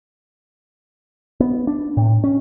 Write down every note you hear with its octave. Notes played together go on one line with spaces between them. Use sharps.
B3
D4
A2
C#4